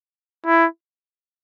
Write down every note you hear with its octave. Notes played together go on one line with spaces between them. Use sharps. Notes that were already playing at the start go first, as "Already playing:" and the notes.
E4